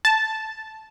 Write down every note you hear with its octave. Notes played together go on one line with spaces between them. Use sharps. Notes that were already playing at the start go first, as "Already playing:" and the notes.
A5